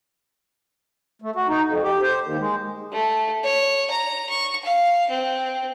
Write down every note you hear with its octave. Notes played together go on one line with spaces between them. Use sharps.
A3
F#4
D#4
F2
G4
C5
D#2
G#3
A3
C#5
A#5
C#6
F5
C4